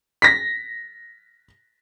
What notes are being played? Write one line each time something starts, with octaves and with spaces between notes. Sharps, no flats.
A#6 B6